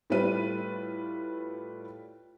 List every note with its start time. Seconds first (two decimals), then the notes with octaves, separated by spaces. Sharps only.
0.10 A2 G3 A3 F4 B4 D#7